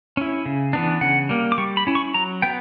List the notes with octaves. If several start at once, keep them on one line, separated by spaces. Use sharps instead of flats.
C#4 E4
C#3
E3 B3 D4
C#3 F#5
G3 A#3
D6
G3 C#6
B5
C#4 E4
C#6
F#3 A#5
B3 G5